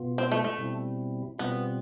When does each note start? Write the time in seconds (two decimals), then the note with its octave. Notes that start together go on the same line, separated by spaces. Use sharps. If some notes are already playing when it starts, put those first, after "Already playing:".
Already playing: B2 B3 F4
0.18 C4
0.32 A3
0.44 A3
0.58 B2 G3 C4 E4
1.38 B2 G3 B3 C4 F4